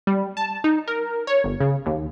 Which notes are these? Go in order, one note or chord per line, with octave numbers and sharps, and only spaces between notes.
G3
A5
D#4
A#4
C#5
G1
C#3
D#2